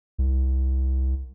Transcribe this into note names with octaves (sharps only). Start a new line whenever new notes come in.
C2